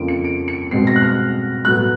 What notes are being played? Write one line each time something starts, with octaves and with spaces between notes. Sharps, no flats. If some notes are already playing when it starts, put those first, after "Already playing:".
Already playing: F2 C#3 F3 A#3 C#4 D7
C#7
D7
C#7
B2 G#3 C4 C7
A#6
F#6
F6
A2 F#3 B3 F#6